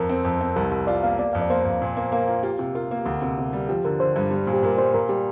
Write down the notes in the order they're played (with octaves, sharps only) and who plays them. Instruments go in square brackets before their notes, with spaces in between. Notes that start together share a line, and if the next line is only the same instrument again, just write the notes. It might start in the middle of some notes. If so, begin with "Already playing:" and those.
Already playing: [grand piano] F2 [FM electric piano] A#4
[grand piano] C4
F2
C4
[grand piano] C2 [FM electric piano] A#4
[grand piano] C2
[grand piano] F4 [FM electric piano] D5
[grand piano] A#3 [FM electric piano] F5
[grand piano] A#3 [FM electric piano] D5
[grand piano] F2 [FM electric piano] F5
[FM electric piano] D5
[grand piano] A#3 [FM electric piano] C5
[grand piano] F2
A#2
A#3
[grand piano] A#3 [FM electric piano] A#4
[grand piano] F4
[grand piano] F4 [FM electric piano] G4
[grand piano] C3 [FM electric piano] G4
[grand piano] F4 [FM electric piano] A#4
[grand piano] A#3
D2
C3
C3
G3
[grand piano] F3 [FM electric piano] G4
[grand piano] D3 [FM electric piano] A#4
[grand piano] D3 [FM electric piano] C5
[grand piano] G2
G3
A#2
[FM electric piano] G4
[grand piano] A#2 [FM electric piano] A#4
[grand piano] G3 [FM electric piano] C5
[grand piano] A#2 [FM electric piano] A#4
[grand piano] G3 [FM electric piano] G4